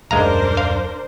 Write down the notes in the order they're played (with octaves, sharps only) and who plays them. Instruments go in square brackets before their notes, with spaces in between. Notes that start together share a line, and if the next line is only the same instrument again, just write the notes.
[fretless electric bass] D#1 F#2 [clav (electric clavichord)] G#3 F5 A#5 [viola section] D4 A#4 C5
[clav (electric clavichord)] F5